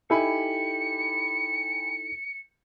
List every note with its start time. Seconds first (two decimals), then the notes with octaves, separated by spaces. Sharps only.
0.10 D#4 E4 G4 A4 G#5 B5 C#7